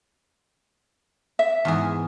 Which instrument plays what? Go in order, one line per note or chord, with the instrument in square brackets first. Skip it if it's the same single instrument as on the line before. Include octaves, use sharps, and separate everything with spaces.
[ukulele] E5
[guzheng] E2 G#2 G#4